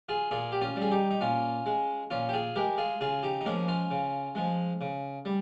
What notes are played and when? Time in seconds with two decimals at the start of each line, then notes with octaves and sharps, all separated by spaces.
0.09 F4 G#4
0.31 A#2 F4 G#4
0.52 G4
0.61 C#4 F4
0.76 G3
0.82 G#4
0.91 D#4 G4
1.10 D#4
1.21 A#2 C#4 F4
1.66 G#3
2.10 A#2 C#4 F4
2.29 G4
2.33 F4 G#4
2.56 G#3 G4 A#4
2.78 F4 G#4
3.01 C#3 F4 G#4
3.23 D#4 G4
3.41 D#4
3.45 F3 G#3 A#3 C#4
3.68 C#4 F4
3.91 C#3
4.35 F3 G#3
4.81 C#3
5.25 G3